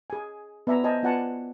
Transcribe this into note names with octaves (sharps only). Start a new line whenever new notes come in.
G#4 G#5
B3 D5 E5 G#5 A#5
C5 D#5 G#5 A5
B3 F4 D5 F#5 G#5 A5